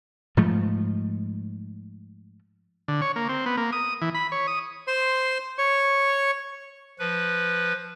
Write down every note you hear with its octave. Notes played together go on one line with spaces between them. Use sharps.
G#2 F3 A3
D3
C#5
A#3
C4
B3
A#3
D#6
E3
B5
C#5
D#6
C5 C6
C#5 C#6
F3 B4